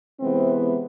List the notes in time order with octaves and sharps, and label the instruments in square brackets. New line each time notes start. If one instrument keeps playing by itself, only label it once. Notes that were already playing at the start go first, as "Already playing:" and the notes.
[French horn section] C3 E3 G#3 B3 C4